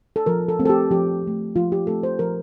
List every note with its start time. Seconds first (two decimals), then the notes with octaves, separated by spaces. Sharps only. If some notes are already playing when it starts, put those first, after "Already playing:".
0.16 A4
0.26 F3 A#4
0.48 A4
0.59 A3 C4
0.65 A4
0.69 G4
0.91 F3 G4
1.23 A3 C4
1.56 F3 F4
1.72 G4
1.87 A3 C4 A4
2.03 C5
2.19 F3 A#4